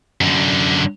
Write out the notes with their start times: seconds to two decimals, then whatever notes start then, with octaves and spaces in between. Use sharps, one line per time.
0.21 F#2 D3